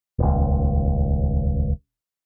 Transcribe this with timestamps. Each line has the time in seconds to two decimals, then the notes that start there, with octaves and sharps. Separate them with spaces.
0.19 D#1 C#2